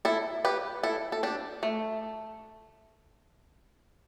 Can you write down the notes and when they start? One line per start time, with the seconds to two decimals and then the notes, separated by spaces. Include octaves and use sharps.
0.05 E4 A4
0.45 G4 B4
0.83 E4 A4
1.12 A4
1.23 D4 G4
1.63 A3